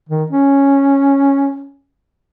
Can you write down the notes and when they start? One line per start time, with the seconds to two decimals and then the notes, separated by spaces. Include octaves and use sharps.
0.09 D#3
0.30 C#4